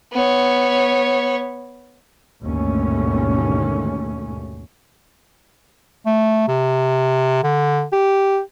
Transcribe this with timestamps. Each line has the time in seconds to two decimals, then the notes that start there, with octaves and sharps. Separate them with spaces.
0.13 B3 C#5
2.42 G#1 D#2 B2 D3 A3 C#4
6.06 A3
6.48 C3
7.43 D3
7.92 G4